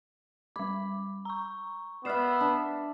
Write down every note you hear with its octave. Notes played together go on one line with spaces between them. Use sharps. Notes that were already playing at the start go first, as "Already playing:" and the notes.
G3 B5 D6
A#5 C#6
B3 D5 E5 F6 C7 E7
D4